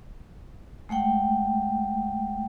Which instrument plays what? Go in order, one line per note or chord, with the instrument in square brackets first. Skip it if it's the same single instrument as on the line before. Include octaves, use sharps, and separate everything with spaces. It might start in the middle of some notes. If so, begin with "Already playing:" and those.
[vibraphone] G#3 A3 F#5 G5